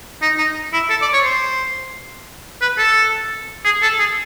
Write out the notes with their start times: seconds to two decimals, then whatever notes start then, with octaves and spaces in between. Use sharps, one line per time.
0.22 D#4
0.38 D#4
0.73 E4
0.90 A4
1.02 D5
1.14 C#5
1.24 C5
2.62 B4
2.78 A4
3.65 G#4
3.83 A4
4.00 G#4